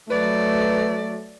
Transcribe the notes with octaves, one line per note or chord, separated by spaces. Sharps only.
F#3 A3 B4 D5